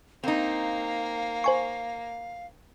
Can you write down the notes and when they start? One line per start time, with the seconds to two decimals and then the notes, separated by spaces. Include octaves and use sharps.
0.23 A#3 C4 D#4 F5
1.44 C5 G#5 C#6